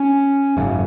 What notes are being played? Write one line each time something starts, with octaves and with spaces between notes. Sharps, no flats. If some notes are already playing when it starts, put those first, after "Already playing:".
Already playing: C#4
G#1 F#2 C#3